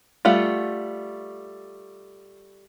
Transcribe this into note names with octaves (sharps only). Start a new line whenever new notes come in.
G3 A3 F4 F#5